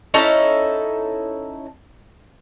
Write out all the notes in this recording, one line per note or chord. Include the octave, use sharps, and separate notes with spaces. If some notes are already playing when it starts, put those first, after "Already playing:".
C#4 D#4 E4 A4